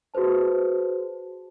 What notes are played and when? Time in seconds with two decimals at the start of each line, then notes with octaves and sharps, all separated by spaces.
0.14 F#4 G#4 B4 C5 A5